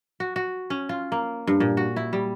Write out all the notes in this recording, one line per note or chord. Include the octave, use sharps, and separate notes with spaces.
F#4
F#4
C#4
F4
A#3
G2
A#2
F#4
E4
G3